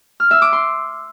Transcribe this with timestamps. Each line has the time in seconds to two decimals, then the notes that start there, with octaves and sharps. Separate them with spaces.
0.20 F6
0.31 E5
0.42 D6
0.53 C6